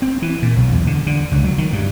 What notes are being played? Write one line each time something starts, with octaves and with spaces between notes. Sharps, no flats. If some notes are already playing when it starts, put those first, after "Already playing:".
C4
E3
A#2
B1
E2
D3
D3
C#2
F#3
D#3
G2